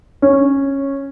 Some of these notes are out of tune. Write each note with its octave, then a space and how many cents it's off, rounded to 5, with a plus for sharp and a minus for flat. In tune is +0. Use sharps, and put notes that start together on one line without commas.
C#4 -10